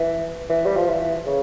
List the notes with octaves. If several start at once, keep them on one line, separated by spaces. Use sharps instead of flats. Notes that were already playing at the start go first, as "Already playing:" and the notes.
Already playing: E3
E3
G3
F3
E3
C#3